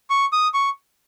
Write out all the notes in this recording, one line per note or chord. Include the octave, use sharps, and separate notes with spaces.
C#6
D#6
C#6